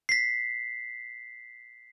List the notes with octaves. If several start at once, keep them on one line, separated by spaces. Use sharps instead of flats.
B6 C7